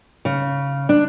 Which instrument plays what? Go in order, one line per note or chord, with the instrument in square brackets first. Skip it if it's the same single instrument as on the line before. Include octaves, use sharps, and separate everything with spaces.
[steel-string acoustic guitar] C#3
D4